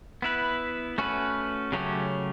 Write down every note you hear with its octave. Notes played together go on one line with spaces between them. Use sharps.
B3 E4 B4
A3 C#4 F#4 B4
C#3 F#3 A3 C#4 G4